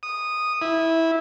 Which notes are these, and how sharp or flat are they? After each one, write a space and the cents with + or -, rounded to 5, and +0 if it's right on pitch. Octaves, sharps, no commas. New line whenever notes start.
D#6 -10
E4 -15